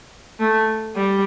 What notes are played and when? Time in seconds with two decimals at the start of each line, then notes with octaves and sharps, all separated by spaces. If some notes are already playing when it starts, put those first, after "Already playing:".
0.39 A3
0.96 G3